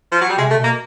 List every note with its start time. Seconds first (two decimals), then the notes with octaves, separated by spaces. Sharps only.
0.12 F3
0.21 F#3
0.30 G3
0.38 C3 G#3
0.51 A3
0.57 B2
0.64 A#3